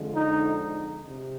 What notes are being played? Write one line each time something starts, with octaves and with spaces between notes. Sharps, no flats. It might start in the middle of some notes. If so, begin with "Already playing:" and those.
Already playing: F2 D3 F3 G#3
D#4
C3